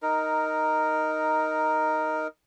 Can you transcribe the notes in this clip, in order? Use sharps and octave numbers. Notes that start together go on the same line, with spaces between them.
D#4 A#4